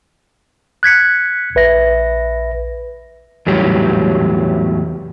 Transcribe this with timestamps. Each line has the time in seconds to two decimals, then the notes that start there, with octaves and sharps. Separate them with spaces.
0.83 F#6 G#6 B6 C#7
1.55 A#1 B4 E5 A#6
3.47 E2 A2 F#3 G3 G4 C#5